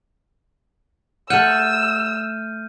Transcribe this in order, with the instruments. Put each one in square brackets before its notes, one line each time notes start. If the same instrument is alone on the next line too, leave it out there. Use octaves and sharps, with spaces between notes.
[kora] A3 F#5 [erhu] E6 [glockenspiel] F6 G6 D#7